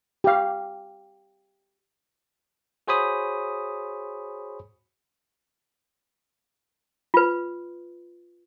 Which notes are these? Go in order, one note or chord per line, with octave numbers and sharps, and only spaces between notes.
G4 F5
F#4 G#4 C5 C#5 B5 D#6
F4 B4